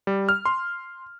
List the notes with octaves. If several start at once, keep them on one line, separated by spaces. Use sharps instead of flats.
G3
F6
C6